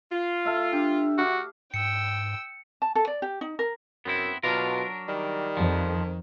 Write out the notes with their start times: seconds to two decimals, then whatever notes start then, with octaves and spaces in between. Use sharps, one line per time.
0.12 F4
0.45 A4 E5 F5
0.73 D4 G4
1.18 F#4 F5 D6
1.74 G#2 G5 E6 C#7
2.82 A5
2.95 A4
3.07 D5
3.22 G4
3.41 D#4
3.59 A#4
4.05 F#2 B3 C4 E4
4.43 B2 F#3 D4 F4 A#4
5.08 D#3 G3
5.57 F2 F3